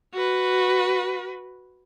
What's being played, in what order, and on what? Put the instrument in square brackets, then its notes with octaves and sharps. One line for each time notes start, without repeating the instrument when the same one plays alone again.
[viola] F#4 B4